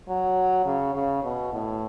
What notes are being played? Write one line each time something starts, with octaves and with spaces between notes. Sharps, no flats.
F#3
C#3
C#3
B2
A2